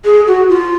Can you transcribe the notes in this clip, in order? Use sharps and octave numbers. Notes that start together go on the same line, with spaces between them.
G#4
F#4
F4